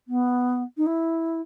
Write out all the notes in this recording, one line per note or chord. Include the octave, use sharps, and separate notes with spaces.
B3
D#4
E4